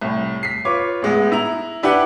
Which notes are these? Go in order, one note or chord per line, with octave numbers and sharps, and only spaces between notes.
C2 A2
B6 C7
F4 B4 C#5 D6
A1 G#3 B3
E4 A#5 F7
D4 E4 G4 B4 F#5